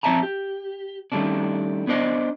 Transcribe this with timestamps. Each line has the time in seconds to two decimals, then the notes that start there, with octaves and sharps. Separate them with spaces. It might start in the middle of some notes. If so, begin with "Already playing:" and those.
0.03 F3 C4 C#5 E5 A5 A#5
0.23 G4
1.12 D#3 G3 A3 C#4 D4
1.87 B3 D4 C5 D5 D#5